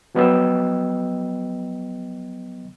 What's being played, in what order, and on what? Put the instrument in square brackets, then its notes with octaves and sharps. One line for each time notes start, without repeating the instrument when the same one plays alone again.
[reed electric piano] F3 F#3 B3 D#5 G5 E6